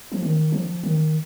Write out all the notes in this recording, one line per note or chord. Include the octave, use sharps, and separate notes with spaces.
F3
D#3
F3
D#3